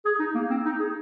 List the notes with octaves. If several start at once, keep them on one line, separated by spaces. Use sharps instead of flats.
G#4
D#4
A#3
C4
D#4
G#4